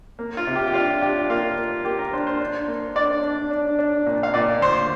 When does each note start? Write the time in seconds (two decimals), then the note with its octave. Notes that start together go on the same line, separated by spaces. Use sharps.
0.19 A#3
0.37 F4
0.47 C3
0.55 G4
0.67 G4
0.74 D4 F4
1.02 D4 G4
1.30 A#3 F4
1.58 A#3
1.85 A#3 G4
1.99 A#4
2.13 D4 C5
2.27 C5
2.41 D4
2.68 A#3
2.95 D4 D5
3.23 D4
3.51 D4
3.79 D4
4.06 A#2
4.23 F5
4.34 A#2 D5
4.62 D2 C5